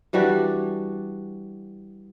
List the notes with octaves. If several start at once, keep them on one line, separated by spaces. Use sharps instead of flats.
E3 G3 D4 F#4